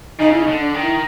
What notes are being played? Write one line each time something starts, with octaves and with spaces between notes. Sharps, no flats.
C#3 D#4
E4
D#4
D3
D4
D#3
E4